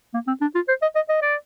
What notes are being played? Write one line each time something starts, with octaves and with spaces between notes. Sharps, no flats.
A#3
C4
D4
F4
C5
D#5
D#5
D#5
D5